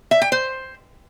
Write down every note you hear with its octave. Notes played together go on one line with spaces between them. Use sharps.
E5
G5
C5